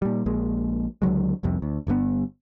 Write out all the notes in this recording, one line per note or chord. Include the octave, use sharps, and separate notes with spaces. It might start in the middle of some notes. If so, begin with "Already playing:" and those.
A#2 G3
A#1 A#2 G#3
C#2 D3 F#3 G#3
F1 C2 F2 C3
D2
G1 G2 A#2 B3